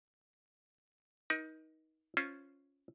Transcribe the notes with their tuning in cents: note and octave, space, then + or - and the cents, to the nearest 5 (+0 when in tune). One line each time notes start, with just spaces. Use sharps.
D#4 +20 A#4 +45
C#4 +0 F4 +0 C5 +0